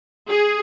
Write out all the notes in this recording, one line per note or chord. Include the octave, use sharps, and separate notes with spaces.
G#4